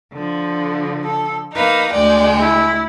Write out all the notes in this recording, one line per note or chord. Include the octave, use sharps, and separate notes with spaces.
D3 F3
A4
A#3 D#4 B4 F5
D2 G#3 D5 G5
E4